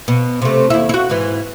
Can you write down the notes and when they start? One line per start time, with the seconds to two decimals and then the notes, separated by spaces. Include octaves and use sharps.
0.08 B2
0.42 C3 A3
0.70 D#2 E4
0.89 E4 F#4
1.09 G#2 E3